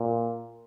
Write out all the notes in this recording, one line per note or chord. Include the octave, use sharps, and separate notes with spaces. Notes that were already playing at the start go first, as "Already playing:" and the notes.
Already playing: A#2